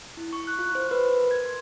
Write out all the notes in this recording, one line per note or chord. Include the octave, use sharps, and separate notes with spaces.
E4
C#6
F#6
F4
C5
B4
A#4
G#6
C6